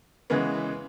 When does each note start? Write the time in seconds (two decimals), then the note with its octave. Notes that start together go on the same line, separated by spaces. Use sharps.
0.30 C#3 E3 G#3 B3